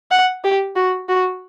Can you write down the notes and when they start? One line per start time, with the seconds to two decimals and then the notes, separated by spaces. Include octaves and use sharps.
0.11 F#5
0.44 G4
0.76 F#4
1.09 F#4